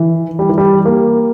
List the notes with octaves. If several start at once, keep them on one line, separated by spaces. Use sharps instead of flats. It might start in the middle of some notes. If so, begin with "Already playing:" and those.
Already playing: E3
G3
E3
G3
A#3